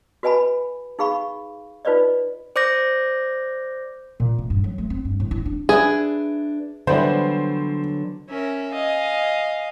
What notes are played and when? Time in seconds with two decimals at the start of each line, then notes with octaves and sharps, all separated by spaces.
0.23 F#4 B4 D#5 G#5 A5 B5
0.99 D#4 G#4 F5 B5 C#6
1.85 D#4 F4 B4 C5 D5 D#5
2.56 C5 D5 D6 G6 A#6
4.20 A#2
4.39 A3
4.50 G2
4.64 F#3
4.78 A3
4.90 C4
5.05 G2
5.20 A2
5.31 E4
5.45 D4
5.69 D4 G#4 B4 E5
6.87 D3 E3 F#3 G3 B3 C5
8.30 C#4 A#4 E5
8.72 D#5 F5 G#5